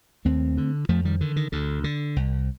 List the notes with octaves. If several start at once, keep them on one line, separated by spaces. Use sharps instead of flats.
D#2 A3 C4
D3
F2 F3 A3
D#3 G3
D3 D#3
D#3
D2 D3
D3
C2